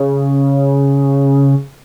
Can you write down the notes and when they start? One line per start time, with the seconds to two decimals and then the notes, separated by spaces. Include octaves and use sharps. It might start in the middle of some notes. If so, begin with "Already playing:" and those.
Already playing: C#3